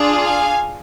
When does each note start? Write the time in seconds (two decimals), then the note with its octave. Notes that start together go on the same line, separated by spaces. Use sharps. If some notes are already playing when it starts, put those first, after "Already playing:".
Already playing: D4 F4 G#4
0.22 F5 G#5